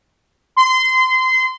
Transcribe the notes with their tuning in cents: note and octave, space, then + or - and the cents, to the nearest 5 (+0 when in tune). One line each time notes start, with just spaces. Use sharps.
C6 -25